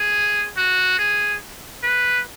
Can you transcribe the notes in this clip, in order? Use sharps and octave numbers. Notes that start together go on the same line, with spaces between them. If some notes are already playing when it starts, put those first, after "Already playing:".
Already playing: G#4
F#4
G#4
B4